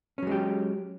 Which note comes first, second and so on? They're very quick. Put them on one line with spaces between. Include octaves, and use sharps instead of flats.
C#4 F#3 G#3 G4